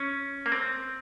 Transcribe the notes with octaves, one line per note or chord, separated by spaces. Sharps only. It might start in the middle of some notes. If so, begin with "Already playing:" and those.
Already playing: C#4
A#3
C4